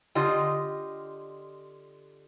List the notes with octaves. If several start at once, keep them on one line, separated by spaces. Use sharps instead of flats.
D3 F4 G4 D#5